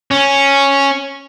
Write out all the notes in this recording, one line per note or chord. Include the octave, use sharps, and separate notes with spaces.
C#4